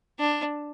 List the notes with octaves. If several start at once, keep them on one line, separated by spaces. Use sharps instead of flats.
D4